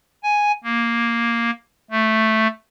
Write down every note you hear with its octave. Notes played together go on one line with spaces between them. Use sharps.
G#5
A#3
A3